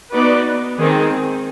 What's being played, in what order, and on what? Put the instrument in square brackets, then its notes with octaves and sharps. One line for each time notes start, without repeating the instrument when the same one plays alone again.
[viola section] B3 D#4 F#4 B4 D5
D#3 G#3 C4 D#4 G#4